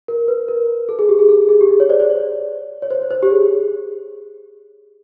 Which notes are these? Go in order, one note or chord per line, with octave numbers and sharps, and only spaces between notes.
A#4
B4
A#4
A4
G#4
G4
G#4
A4
G#4
G4
G#4
C#5
C5 D5
C5 D5
C#5
C#5
C5
C#5
C5
G4
G#4